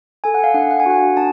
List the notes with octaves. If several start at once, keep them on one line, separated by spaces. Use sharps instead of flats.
A4 G#5
F#5
F5
D4 F#5
F#5
G#5
F#4 F#5
D4 A5